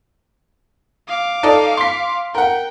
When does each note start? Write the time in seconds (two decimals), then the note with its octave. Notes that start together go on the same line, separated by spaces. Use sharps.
1.08 F5 D6
1.43 D#4 A4 D5
1.77 C6 B6
2.35 A#4 F#5 G5